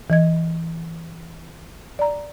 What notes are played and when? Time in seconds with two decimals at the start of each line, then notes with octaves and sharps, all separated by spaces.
0.10 E3 D#5 G#6
1.99 D5 A#5